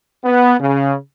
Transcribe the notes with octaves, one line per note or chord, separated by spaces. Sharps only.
B3
C#3